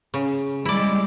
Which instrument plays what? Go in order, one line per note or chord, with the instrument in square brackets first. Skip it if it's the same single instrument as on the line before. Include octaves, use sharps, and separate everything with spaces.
[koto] C#3
[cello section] G3 G#3 [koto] E4 D5